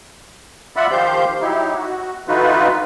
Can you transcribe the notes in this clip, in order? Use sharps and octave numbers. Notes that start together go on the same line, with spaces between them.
F4 D5 E5 F#5 B5
D#3 F3 G4 C5 F5 G6
F#3 D#4 E4 G4
F#4
D3 E3 D#4 F4 F#4 B4